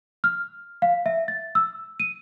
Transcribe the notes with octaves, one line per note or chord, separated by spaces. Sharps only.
F6
F5
E5
A6
E6
D#7